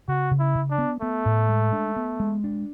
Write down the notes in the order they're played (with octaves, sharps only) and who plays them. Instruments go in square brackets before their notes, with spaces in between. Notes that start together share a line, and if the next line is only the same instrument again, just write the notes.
[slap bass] C#3 [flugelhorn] F#4
[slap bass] C#3
[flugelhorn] E4
[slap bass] C#3
[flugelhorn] D4
[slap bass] B3
[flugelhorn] A3 [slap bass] B3
[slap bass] A2
G#3
D4
B3
G#3
D4